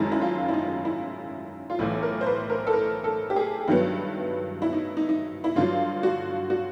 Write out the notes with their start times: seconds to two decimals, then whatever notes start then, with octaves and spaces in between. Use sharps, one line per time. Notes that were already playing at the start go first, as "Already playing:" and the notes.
Already playing: F#1 F#2 D#3 G#3 E4
0.12 E4
0.21 F4
0.48 E4
0.53 D#4
0.85 E4
1.70 F4
1.79 B1 A2 E3 E4
2.03 A#4
2.21 C5
2.26 B4
2.50 A#4
2.67 A4
2.73 A#4
3.04 A4
3.30 G4
3.36 G#4
3.68 G2 D#3 F#3 B3 E4
4.62 E4
4.73 D#4
4.97 D#4
5.09 D#4
5.44 E4
5.56 G2 D3 F#3 F4
6.03 F#4
6.50 F#4